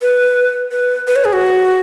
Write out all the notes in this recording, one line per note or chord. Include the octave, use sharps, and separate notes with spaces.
B4
B4
B4
C#5
G#4
F#4